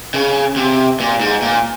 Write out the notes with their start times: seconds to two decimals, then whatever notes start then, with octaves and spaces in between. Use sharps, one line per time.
0.14 C#3
0.56 C3
1.00 A#2
1.20 G#2
1.42 A#2